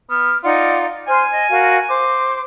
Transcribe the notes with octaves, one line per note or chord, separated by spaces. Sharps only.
B3 F6
D#4 F4 D5 F#5
C5 G#5 C6 F6
D#5
F#4 A#4 F5
C5 D6